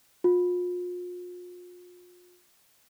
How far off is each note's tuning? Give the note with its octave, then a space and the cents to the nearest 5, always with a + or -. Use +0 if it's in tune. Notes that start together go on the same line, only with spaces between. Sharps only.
F4 +40